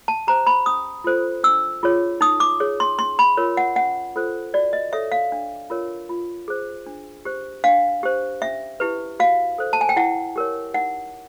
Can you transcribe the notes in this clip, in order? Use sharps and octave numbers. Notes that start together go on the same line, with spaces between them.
A5
G4 C5 A#5
B5
C#4 D#6
F4 A4 C5
D4 E6
F4 G#4 C#5
D#4 D#6
D6
G#4 C#5
C6
C#4 C6
B5
F4 A#4 C#5
F#5
C#4 F#5
F4 A4 C5
F#4 D5
D#5
A4 C#5 E5
F5
D4
F4 A#4 C#5
F4
G#4 C5
D4
G4 C5
D4 F5
G4 C5
C#4 E5
E4 G4 B4
F#4 F5
A4 C5
A5
G#5
G5
E4 F#5
G4 A#4 C#5
D#4 F#5